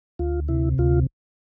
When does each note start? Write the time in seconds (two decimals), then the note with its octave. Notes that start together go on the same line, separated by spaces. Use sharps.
0.19 D2 F4
0.48 C3 E4
0.78 D2 F4